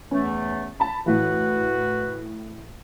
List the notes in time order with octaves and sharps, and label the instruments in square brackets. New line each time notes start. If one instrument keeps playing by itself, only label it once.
[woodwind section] E2 E3 A3 [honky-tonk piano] C#4
[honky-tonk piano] A5 B5
[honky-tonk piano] A2 E3 [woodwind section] F#4 B4